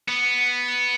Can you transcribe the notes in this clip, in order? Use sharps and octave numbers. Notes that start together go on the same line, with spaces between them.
B3